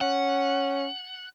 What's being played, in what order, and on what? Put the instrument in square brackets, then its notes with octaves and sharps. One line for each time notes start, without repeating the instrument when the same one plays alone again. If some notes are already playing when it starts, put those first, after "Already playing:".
[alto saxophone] C#4 [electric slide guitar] F#5